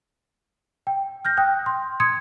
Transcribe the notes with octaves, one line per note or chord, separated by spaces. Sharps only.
G5
F6 G6 A#6
G5 D#6 F#6
C6
C6 D#6 G#6 C#7